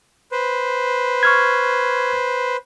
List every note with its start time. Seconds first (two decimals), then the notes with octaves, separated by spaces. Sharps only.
0.32 B4 C5
1.23 C#6 F6 G#6